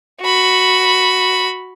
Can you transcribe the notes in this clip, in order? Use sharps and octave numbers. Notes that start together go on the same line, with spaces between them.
F#4 B5